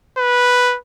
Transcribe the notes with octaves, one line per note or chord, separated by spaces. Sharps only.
B4